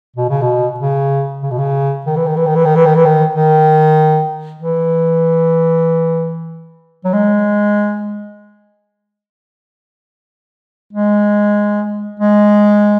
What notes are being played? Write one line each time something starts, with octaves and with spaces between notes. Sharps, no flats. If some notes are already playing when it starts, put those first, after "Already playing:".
B2
C#3
B2
C#3
C#3
B2
C#3
D#3
E3
D#3
E3
D#3
E3
D#3
E3
D#3
E3
D#3
D#3
E3
F#3
G#3
G#3
G#3